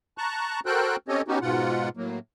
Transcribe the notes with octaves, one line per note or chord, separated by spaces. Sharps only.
A5 A#5 C#6 F#6
F#4 A4 A#4 C5 G5 F#6
C4 C#4 G4 A4 C#5 D#5
B3 C#4 D#4 F#4 G4
G#2 B2 F4 F#5
A2 F#3 A#3